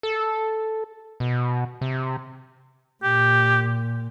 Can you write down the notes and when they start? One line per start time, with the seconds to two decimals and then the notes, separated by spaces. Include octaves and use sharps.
0.03 A4
1.20 B2
1.81 C3
3.03 A#2 G4